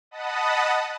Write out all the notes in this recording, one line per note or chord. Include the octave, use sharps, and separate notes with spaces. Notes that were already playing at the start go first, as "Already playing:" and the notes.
D#5 F#5 A5 B5 D#6